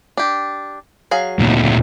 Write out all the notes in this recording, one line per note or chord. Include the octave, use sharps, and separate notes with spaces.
D4 G4
F#3 G#4 F5
D2 A#2